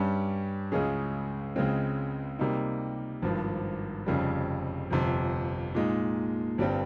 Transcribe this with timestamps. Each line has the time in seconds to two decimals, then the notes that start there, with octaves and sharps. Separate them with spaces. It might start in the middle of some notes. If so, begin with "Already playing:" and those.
Already playing: G2 G3 C#4
0.72 C#2 C#3 G#3 C#4 G#4
1.56 C#2 C#3 G#3 C4
2.39 C3 G3 A#3 D#4
3.22 G#1 G2 F3
4.06 F1 F2 C#3 G3
4.90 G1 F2 C3
5.75 A#2 G#3 D#4
6.58 G1 G2 G3 C4